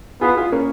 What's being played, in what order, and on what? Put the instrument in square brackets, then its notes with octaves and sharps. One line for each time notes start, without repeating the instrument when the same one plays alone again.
[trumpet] B3 [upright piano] F4 G#4
[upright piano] F4 G#4
A#3 C#4